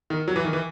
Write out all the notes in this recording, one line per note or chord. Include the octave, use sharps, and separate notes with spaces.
D#3
F#3
E3
D#3
E3